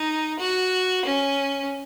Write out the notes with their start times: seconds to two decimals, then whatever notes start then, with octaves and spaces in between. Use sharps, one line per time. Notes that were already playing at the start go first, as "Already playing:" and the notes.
Already playing: D#4
0.39 F#4
1.05 C#4